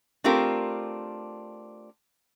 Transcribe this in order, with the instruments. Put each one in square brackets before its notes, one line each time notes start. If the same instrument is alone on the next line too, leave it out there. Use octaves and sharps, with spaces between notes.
[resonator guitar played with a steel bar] A3 C4 D4 F4 G4 A#4